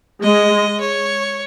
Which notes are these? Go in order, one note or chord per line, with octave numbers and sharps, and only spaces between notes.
G#3 D#5
C#5